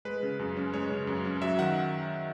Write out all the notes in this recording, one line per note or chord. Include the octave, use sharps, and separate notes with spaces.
G#3 B4
C#3
F#2
C#4
G#3 C#5
C#3
F#2
C#4
F#3 E5
D#3 F#5